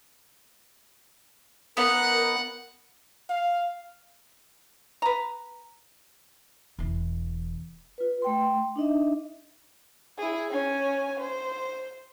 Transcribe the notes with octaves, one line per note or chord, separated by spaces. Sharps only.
B3 D#4 A#4 F#5
F5
B4 A#5
E1 E3
F4 B4
A3 G5 C6
D4 D#4 D#5 E5
E4 G#4
C#4 G#5
C5